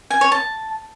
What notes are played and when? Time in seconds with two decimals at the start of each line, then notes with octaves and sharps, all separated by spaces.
0.11 G#5
0.21 C#5
0.32 A5